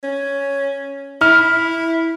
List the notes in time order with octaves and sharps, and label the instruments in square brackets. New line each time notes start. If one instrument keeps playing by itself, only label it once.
[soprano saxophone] C#4
[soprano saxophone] E4 [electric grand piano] F6